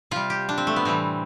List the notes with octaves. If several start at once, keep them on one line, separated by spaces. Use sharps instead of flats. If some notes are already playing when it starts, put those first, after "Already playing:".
C3 G3 F4
G4
D4
C4
A3
B3
A2 E3 G3 C4